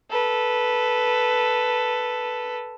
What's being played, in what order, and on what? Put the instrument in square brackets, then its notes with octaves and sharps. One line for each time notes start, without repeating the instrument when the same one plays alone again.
[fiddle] A4 B4